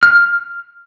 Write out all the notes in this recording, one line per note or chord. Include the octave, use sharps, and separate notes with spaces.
F6